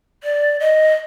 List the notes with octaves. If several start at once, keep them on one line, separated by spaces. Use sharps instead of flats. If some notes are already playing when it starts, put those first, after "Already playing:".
D5
D#5